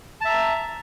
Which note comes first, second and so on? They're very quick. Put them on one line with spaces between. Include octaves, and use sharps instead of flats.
A5 E5 A#5